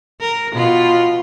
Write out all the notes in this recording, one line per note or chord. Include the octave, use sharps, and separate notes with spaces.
A#4
B2 F4